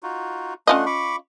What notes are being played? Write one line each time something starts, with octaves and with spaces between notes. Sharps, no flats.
D#4 F4 F#4
A3 C#4 D4 F4 D#5 F#5
B5 C#6 D6